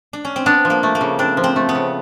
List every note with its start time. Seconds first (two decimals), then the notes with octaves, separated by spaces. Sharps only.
0.13 D4
0.25 C#4
0.36 C4
0.46 B3 D4
0.65 F3
0.70 A#3
0.83 A3
0.95 A#3
1.01 C#3
1.19 C4 D4
1.37 F3
1.44 C4
1.56 A3
1.69 B3
1.75 C#3